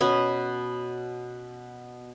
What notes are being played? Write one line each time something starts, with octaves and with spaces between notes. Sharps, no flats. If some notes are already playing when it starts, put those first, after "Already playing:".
B2 B3 C#4